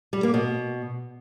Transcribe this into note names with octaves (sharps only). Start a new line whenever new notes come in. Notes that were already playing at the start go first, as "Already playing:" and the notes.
G3
A#3
B2